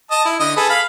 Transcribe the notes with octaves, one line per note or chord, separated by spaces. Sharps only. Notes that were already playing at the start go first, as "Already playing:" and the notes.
D#5 A5
E4
D3 D#5
G#4 A4 B4
F5 B5